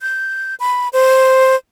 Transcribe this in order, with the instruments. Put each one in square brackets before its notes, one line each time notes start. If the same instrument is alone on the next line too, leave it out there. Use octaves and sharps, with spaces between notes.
[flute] G6
B5
C5